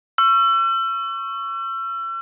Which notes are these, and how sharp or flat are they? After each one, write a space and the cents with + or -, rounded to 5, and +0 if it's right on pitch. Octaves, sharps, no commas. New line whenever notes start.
C#6 +0 E6 +40